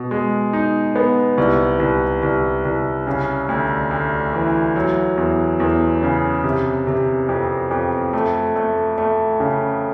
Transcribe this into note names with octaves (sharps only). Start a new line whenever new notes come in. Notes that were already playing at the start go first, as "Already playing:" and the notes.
Already playing: B2
G#3
D#4
B3
C2
C2
C2
C2
C#3
D2
D2
E3
F#3
E2
E2
C#3
C3
C3
F2
F2
A3
A3
A3
C#3